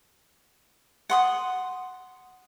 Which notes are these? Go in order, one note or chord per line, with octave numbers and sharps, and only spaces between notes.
F#5 C6 D#6